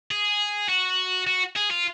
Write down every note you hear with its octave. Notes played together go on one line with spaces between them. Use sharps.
G#4
F#4
F#4
G#4
F4